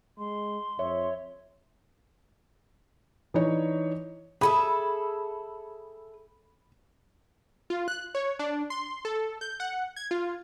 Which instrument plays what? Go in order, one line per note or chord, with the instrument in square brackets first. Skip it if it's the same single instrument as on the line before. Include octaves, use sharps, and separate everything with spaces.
[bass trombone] G#3 [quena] C6
[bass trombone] F2 [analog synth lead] C#5 [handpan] E5
[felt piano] E3 D4 D#4 C#5
[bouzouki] G#4 A4 E5 [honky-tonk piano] B5
[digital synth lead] F4
F#6
C#5
D4
C6
A4
G6
F#5
G#6
F4